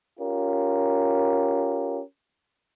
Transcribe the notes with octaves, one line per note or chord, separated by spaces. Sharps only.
C#4 F4 G4 A#4